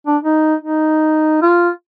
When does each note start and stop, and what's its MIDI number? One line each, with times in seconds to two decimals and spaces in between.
0.07 0.17 62
0.23 0.55 63
0.61 1.38 63
1.42 1.70 65